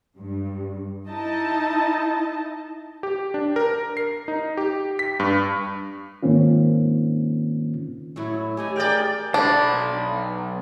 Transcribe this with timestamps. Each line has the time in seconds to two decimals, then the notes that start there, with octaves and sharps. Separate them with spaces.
0.17 G2
1.08 D#4 E4 D#5 A5
3.03 G4
3.34 D4
3.56 A#4
3.97 C7
4.28 D#4
4.57 G4
4.99 B6
5.20 G2
6.23 G#2 D#3 A#3 C4 C#4 F4
8.16 A2 F#3 E4
8.57 A3 C#4 G4 D#5 G#5
8.76 G#4 A#4 D5 G5
9.34 B1 D4 B5